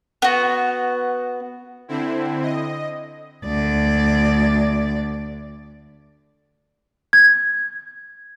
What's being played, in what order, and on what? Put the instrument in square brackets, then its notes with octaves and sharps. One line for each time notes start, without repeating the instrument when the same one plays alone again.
[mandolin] B3 F#4
[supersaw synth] D3 C4 E4
D#5
[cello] D2 D5
[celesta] G#6